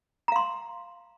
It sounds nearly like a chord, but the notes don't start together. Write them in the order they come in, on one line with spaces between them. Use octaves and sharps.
A#5 F5 C6